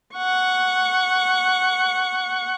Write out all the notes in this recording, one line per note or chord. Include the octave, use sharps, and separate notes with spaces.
F#5 C#6